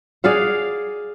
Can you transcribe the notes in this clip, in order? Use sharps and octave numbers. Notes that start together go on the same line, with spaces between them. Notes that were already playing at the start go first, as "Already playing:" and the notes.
G#4 D5 F5 F#5